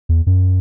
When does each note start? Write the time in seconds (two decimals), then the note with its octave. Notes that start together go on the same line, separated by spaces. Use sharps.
0.09 E2
0.27 F#2